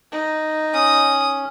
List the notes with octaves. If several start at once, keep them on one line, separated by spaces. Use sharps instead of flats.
D#4
C#4 D#6